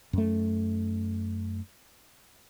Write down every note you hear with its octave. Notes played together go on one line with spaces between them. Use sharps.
F#2 A3